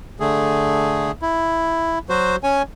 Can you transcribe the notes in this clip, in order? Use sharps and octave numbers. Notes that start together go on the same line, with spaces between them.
D3 A3 G#4
E4
F#3 F#4 C5
C#4 C#5 G#5